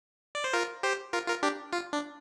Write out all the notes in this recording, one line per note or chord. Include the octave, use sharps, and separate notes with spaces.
D5
C5
F4 A#4
G4 C5
F4 A#4
F4 A#4
D4 G4
F4
D4